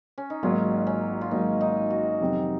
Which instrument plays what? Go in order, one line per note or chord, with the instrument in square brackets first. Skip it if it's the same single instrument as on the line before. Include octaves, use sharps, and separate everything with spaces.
[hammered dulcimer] C#4
D#4
[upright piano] G#1 G#2 F#3 A#3 [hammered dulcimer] F4
[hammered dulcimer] C#4
F4
[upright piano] G#1 G#2 F#3 A#3 [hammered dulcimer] D#4
[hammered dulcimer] D#4
F#4
[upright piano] F2 C3 D#3 F#3 C4